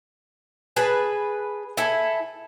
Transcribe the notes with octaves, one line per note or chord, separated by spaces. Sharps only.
G#4 B4 G#5 A5
E4 A4 G#5